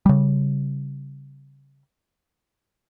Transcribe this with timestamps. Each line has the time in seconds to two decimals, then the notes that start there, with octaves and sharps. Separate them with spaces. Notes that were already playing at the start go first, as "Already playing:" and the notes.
0.06 C#3 G3